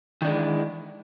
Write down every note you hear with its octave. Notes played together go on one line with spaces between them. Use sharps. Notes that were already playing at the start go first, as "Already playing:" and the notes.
D#3 E3 G#3 D4